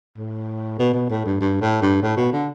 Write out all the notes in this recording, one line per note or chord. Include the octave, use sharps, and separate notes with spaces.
A2
B2
B2
A2
G2
G2
A2
G2
A2
B2
D3